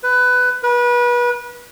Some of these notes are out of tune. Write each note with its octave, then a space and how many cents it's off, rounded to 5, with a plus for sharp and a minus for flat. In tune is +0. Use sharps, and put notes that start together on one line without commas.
B4 +15
B4 -30